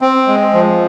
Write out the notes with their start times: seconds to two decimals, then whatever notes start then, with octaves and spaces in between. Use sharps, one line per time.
0.01 C4
0.27 G#3
0.53 F3